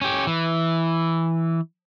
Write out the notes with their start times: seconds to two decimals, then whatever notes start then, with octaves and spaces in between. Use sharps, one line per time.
0.01 C#4 G4
0.27 E3